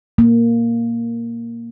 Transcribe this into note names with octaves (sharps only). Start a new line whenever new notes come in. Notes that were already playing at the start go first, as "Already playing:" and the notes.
A#3